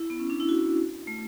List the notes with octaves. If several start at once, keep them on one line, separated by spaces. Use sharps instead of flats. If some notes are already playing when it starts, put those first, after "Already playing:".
Already playing: E4
B3
C#4
D4
E4
F#4
A3